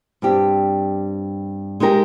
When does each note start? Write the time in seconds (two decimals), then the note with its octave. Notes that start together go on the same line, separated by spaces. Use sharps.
0.22 G2 G3 C4 G4
1.80 G#3 D#4 G4 A#4